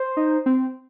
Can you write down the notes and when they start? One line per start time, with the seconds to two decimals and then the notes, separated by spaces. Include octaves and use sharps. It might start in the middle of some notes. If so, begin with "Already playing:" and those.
Already playing: C5
0.17 D#4
0.46 C4